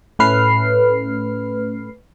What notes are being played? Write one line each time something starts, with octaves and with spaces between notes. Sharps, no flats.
A2 A3 C#4 B4 F6 C7